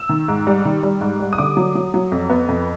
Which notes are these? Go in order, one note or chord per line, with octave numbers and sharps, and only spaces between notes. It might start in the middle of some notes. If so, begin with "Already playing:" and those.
Already playing: E6
D#3
G#2
G3
D#3
G3
G#2
G3
D#6
D3 D6
F#3
F#3
F#3
F2
B3
F2